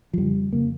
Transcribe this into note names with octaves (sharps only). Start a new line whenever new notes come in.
F3
F2 C#3 G3
F2 C#3 A#3